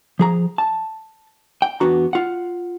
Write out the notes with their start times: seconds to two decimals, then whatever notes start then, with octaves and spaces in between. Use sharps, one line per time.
0.19 F3 G#4 A#5
0.58 A5
1.62 G5
1.80 E2 B3 D4 F#4 A#5
2.13 F4 F#5